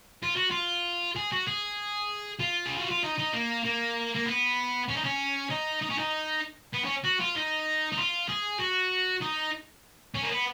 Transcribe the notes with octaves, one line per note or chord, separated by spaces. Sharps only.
F4
F#4
F4
G#4
F#4
G#4
F4
G#4
F#4
F4
D#4
D#4
A#3
A#3
A#3
B3
C#4
D#4
C#4
D#4
D#4
C#4
D#4
B3
C#4
F#4
F4
D#4
D#4
F4
G#4
F#4
D#4
C#4
A#3
B3